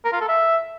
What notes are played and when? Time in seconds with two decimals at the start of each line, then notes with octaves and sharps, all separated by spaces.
0.05 A#4
0.13 F4
0.20 A4
0.28 E5